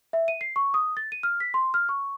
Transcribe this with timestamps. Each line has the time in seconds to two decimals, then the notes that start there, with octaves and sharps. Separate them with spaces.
0.13 E5
0.28 D#7
0.41 C7
0.56 C#6
0.74 D#6
0.97 A6
1.12 D#7
1.23 F6
1.40 B6
1.54 C6
1.74 F6
1.89 C#6